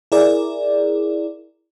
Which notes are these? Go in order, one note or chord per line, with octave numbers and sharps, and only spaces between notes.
E4 G#4 A#4 D5